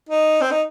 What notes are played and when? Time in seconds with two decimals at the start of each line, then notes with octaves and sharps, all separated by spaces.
0.09 D#4
0.41 C4
0.51 D#4